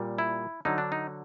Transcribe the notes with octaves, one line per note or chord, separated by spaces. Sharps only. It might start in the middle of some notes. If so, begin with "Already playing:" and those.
Already playing: A#2 G3
E4
D3 F#3 D#4
D4
D#4